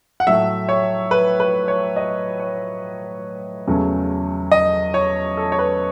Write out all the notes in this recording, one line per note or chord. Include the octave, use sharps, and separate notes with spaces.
F#5
A2 F#3 A3 E5
C#5
B4
B4
C#5
D#5
C#5
E2 C#3 F#3 A3
D#5
C#5
A4
C#5
B4